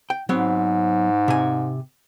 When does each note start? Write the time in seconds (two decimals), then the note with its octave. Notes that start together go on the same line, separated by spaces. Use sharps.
0.10 G5
0.29 G#2 F#3 B3 C4
1.28 C3 G#5